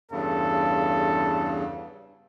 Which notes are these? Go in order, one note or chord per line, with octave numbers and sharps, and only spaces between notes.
E2 G2 C#3 A4